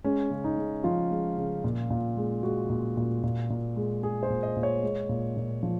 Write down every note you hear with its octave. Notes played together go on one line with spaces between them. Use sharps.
G#3 C#4
C#3
D#4
C#3
F3 F4
G#3
C#3
A#2
A#2
G#3
G#3 F#4
A#2
A#2
A#2
A#2
G#3
G#3 G#4
C5
A#2
D#5
A#2
C#5
G#3
A#2
A#2
F3